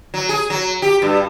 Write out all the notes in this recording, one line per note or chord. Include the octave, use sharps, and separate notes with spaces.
F#3
G#4
F#3
G4
G2